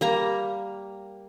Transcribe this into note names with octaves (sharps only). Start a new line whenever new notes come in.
G3 A#3 A#5